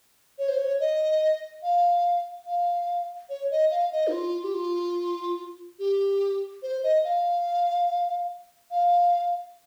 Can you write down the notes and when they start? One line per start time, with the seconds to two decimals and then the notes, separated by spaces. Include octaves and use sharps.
0.39 C#5
0.48 C5
0.58 C#5
0.80 D#5
1.63 F5
2.47 F5
3.30 C#5
3.51 D#5
3.71 F5
3.92 D#5
4.08 D#4
4.12 F4
4.44 G4
4.54 F4
5.79 G4
6.63 C5
6.84 D#5
7.04 F5
8.71 F5